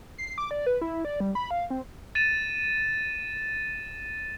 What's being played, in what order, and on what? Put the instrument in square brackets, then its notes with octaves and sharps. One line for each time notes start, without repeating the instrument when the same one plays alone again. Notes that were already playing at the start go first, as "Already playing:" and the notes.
[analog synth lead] C7
D6
D5
B4
E4
D5
G3
B5
F5
C4
[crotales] A6 D#7 E7